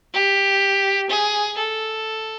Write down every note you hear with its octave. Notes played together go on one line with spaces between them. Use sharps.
G4
G#4
A4